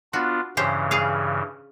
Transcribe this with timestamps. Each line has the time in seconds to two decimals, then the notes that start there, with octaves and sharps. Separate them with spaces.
0.13 B3 D4 F4 F#4
0.57 G2 C#3 E3 C#4 G4 C5
0.91 G#4 F5